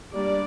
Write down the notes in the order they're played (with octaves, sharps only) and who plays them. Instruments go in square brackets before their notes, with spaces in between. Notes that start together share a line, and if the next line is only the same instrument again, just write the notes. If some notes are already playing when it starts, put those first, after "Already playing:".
[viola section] G3 A#3 D4 D5